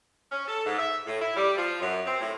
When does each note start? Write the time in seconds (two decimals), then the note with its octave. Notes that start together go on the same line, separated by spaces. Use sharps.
0.31 C#4
0.47 A4
0.66 G#2
0.78 E5
1.06 A2
1.20 E4
1.36 G3
1.57 F3
1.81 F#2
2.07 C4
2.21 A2